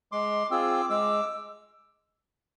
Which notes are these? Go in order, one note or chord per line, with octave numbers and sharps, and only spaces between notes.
G#3 C6 D6
C4 F4 G#4 D6 E6
G#3 D6 E6